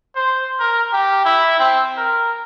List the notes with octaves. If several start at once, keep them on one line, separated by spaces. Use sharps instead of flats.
C5
A#4
G4
E4
C4
A#4